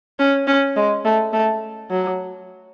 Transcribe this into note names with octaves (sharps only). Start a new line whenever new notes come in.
C#4
C#4
G#3
A3
A3
F#3